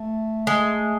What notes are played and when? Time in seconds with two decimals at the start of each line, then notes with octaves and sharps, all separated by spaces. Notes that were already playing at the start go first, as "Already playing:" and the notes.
Already playing: A3
0.47 G#3